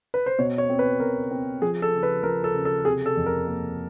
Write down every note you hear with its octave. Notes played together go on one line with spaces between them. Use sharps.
B4
C5
B2 C#5
C#5
C4
B4
B2 A#4
C4
F3 G#4
A4
C#3
B4
F3 A#4
A4
C#3
A4
C3 G#4
A4
F2
A#4
A#3